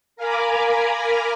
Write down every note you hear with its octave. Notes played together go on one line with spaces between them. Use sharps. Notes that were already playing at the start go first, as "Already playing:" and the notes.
A#4 F5 G#5 A#5 B5 D6